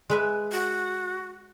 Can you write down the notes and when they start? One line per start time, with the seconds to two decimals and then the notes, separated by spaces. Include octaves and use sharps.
0.10 G#3 B4 E5
0.52 F#4